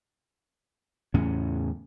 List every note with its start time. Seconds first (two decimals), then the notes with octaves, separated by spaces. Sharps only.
1.14 E2 A2 C#3 C#4